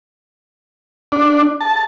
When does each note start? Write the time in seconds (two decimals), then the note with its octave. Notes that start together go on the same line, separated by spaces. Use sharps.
1.12 D4
1.61 A5